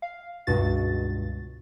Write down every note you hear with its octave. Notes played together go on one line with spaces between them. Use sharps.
F5
C#2 G2 B2 F#4 A6